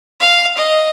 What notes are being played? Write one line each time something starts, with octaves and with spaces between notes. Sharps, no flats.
F5
D#5